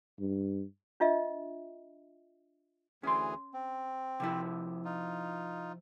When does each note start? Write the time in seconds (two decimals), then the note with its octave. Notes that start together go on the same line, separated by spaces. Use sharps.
0.20 G2
1.00 D4 F4 D#5 E5
3.03 D2 E3 C#4 G#4 C6
3.54 C4
4.20 C3 F3 E4
4.85 D#4 F4